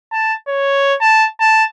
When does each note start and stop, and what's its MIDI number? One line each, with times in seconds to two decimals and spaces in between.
0.12 0.34 81
0.48 0.95 73
1.01 1.26 81
1.40 1.64 81